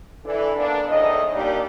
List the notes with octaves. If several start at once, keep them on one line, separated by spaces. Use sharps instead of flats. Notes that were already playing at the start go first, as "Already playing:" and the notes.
E3 D4 A4
D3 A#3 B3 D4
E2 A2 D#3 D#5
A#2 G3 A#3 D4 D#4 G4